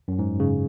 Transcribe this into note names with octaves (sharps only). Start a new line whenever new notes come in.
F#2
G#2
C#3